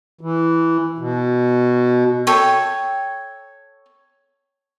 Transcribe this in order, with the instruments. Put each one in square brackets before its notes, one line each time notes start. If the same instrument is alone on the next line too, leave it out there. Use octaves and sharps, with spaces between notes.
[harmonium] E3
B2
[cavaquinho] A4 C#5 G5